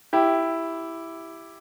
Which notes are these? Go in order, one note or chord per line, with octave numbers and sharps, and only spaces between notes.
E4 G4